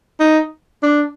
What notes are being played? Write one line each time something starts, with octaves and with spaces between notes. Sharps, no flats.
D#4
D4